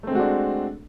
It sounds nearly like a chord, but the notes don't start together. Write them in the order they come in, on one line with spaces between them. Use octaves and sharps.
A3 C4 G#3 F#4 D4